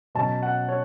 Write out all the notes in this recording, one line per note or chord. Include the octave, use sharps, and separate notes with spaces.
B2 F#3 C#4 A5
F#5
C#5